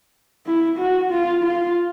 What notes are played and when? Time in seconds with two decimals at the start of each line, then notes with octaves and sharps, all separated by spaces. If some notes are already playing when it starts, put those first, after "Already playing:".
0.46 E4
0.78 F#4
1.11 F4
1.44 F4